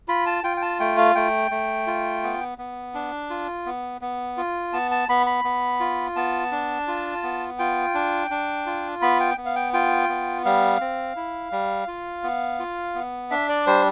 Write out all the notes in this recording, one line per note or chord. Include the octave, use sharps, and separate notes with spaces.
F4 B5
A5
F4 G5
G5
A5
A3 G5
F5
A3 G5
A3
F4
B3
B3
D4
F4
B3
B3
F4
B3 A5
A5
B3 B5
B5
B3
F4
B3 A5
D4
F4
B3
F4 G5
D4
D4
F4
B3 B5
G5
B3
F5
G5
F4 G5
B3
G3 F5
C4
E4
G3
F4
B3
F4
B3
D4 E5
D5
G3 C5